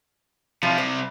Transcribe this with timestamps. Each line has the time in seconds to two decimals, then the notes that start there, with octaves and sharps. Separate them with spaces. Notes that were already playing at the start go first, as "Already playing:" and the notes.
0.63 C3 F3 G3
0.78 C5